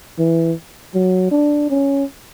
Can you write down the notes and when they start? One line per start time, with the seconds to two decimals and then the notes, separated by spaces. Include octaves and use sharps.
0.19 E3
0.95 F#3
1.31 D4
1.70 C#4